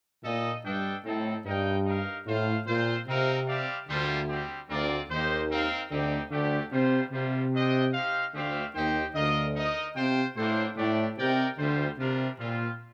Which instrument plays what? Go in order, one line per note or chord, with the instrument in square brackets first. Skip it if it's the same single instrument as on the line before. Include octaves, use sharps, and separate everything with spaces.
[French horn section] A#2 [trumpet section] D#4 A4 D#5
[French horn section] G2 [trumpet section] D4 A4 D#5 G5
[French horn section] A2 [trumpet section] C4 D#4 A4
[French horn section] G2 [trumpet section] D#4 A#4 D#5 G5
[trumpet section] D#4 A#4 F5
[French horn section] A2 [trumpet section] F4 C5 F5
[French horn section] A#2 [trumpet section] C4 F4 C5
[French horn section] C3 [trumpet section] C4 D#4 A#4 F5
[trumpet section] G3 C4 G4 D5 F5
[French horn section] D2 D3 [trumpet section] G3 A#3 F4 A4 C5
[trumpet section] G3 C4 G4
[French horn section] D2 D3 [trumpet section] C4 F4 A#4 D5
[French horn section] D#2 D#3 [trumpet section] A#3 D#4 G4 C5
[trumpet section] C4 D#4 A#4 F5
[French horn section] D2 D3 [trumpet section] C4 D#4 G4
[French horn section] D2 D3 [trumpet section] A3 D4 G4
[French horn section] C3 [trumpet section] G3 A#3 F4 C5
[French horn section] C3 [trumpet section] G3 A#3 F4 C5
[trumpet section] D4 A4 C5 D#5 G5
D#4 G4 C5 F5
[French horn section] D2 D3 [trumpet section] A3 C4 G4 C5 F5
[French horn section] D#2 D#3 [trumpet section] D#4 G4 C5 G5
[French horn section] D2 D3 [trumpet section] F4 A#4 D#5
[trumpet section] D#4 A#4 D#5
[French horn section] C3 [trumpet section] F4 C5 G5
[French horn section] A2 [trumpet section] A#3 D4 A4 C5
[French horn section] A2 [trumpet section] A3 D4 G4 D5
[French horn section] C3 [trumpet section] D#4 A#4 D5 G5
[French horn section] D2 D3 [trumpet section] G3 C4 F4 C5
[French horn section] C3 [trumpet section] G3 D4 F4 A#4
[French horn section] A#2 [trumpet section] G3 C4 F4